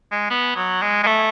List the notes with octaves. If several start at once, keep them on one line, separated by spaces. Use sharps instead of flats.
G#3
B3
F#3
G#3
G#3
A3